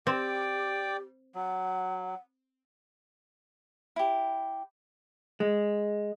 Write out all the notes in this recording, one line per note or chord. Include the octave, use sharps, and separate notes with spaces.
C4 G4 D5 G5 D6
F#3 F#5
E4 G4
G#3